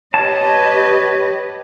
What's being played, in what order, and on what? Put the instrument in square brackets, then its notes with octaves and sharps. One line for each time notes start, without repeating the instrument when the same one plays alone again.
[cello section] G4 B4 D#5 [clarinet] C#5 [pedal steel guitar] A5